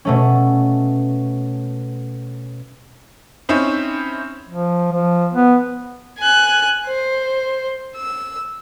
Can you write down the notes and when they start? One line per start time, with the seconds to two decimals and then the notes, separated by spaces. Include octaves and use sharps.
0.05 B2 A3 C#4
3.49 C4 C#4 D#4 E4
4.49 F3
4.92 F3
5.33 B3
6.18 G#5 F#6
6.87 C5
7.96 E6